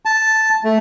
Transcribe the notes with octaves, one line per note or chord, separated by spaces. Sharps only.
A5
A3